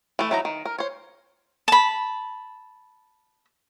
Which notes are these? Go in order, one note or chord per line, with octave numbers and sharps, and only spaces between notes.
E3 A3
E3 F#3 D#4 E4 A#5
D#3
A#4
C5 C#5
A5 B5